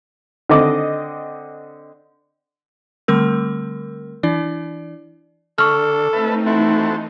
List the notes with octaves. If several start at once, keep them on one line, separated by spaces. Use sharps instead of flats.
D3 C4 D#5 D6
D3 G3 A3 C4 A#4 E6
E3 D4 E4 D5
D3 A4 C#6 F6
A3 C4 D#4 B4 E5 A5
E3 A3 C4 D#4 E4 F#4 A4